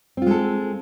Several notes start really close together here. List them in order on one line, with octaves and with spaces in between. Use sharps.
C4 F4 G#3 A4